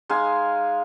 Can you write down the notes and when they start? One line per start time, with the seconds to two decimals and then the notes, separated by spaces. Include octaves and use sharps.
0.09 G#3 D#4 F5 G#5